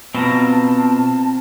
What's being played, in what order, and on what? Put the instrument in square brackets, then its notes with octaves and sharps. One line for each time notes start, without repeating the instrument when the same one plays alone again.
[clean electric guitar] B2 [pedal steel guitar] C4 F4 A#5 [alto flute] A5